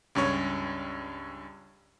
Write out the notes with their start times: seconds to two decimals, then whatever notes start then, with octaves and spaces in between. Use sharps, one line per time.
0.15 C#2 G2 C#4 C#5